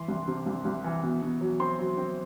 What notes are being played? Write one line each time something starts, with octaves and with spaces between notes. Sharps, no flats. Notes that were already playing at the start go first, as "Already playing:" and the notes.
Already playing: E3 C6
C2
C3
C2
C2
E3
B2
B2
F#3
C4 C6
F#3
C4